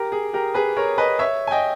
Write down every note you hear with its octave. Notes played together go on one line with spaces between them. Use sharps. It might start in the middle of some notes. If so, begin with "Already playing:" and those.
Already playing: G4 A#4
G#4
G4 A#4
G#4 B4
A#4 C#5
B4 D#5
C#5 E5
G#5
D#5 G5